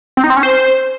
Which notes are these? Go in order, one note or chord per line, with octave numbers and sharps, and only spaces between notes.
C4
D#4
C4
C#4
C5